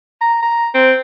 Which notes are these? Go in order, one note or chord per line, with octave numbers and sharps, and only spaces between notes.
A#5
A#5
C4